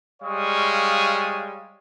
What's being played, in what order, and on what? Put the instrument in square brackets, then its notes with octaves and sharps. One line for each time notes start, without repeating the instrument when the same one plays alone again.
[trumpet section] G3 G#3 C#5 F5 C#6 D#6